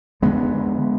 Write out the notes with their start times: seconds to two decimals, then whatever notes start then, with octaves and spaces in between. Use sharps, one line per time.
0.22 F2 D3 G#3 B3